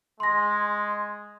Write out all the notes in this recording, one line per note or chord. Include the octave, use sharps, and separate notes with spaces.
G#3 C6 A#6